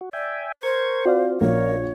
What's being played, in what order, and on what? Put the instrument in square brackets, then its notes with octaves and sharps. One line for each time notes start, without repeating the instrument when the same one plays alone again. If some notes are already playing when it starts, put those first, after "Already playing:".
[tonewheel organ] F#4
[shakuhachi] D5 [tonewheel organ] E5 G5 G#5
[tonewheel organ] A#4 C#6 G#6 [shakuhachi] C5
[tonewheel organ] C4 F4 [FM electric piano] F#4 D5 F5
[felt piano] A#1 [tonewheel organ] A#3 C#4 A#4 [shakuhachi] C#5